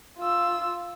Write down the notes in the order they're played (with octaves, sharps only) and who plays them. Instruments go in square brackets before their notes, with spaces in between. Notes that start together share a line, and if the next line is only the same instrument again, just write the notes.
[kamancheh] F4 E6